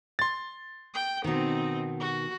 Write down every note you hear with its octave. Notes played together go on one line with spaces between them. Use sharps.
C6 A6
G5
B2 D#3 C4 D#4
F#4